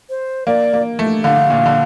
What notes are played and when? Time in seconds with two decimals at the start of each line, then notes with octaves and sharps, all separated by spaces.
0.09 C5
0.47 A#3 D5
0.73 A#3
0.99 A3
1.24 D3 F5
1.50 A#2
1.66 D3